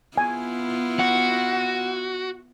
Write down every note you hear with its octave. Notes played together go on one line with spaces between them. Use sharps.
B3 E4 F4 G#5
F#4 F#5